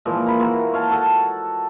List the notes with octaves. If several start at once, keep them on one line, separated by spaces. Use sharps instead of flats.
A#2 E3 F3 G#3
A#5 B5
G#3 A#3 E4 F#4
C#5 F5 A5
F#4 A4 F#5